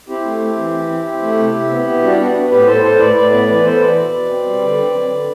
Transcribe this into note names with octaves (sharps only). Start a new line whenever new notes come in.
C4 E4 G4
A3
C4
E3
E3
C4
C4
A3
C3
C3
B3
B3
G3 D4 F#4
B3 D4 F#4
B3
A2 G4 B4
A2 A4 C5
A2 A4 C5
A2 B4 D5
A2 B4 D5
B3 B4 D5
E3 B4 D5
B3 A4 C5
E3 B4 D5
B2
B2
C4
G3
D3
C4
F#3
D3